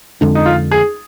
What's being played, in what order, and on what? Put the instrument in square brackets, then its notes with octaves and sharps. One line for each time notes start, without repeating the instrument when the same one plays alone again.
[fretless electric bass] F2 D3 G#3 D4
[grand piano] D#4
F4
G#4